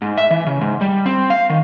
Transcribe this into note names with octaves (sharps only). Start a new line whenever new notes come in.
G#2
E5
E3
C#3
G#2
G3
C4
F5
D#3